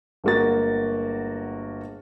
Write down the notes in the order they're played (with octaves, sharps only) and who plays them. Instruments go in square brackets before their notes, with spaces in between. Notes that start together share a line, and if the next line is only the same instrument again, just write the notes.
[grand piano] G1 G#3 A#3 F#4 A6